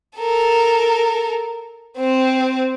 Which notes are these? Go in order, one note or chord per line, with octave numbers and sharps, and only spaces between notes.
A4 A#4
C4 C5